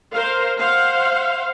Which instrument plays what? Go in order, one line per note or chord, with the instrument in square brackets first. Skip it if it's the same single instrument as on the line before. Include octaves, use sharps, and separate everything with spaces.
[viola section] A#4 C5 F5
C5 F5 F#5